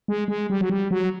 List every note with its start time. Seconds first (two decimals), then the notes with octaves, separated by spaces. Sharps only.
0.08 G#3
0.28 G#3
0.50 G3
0.61 F#3
0.70 G3
0.91 F#3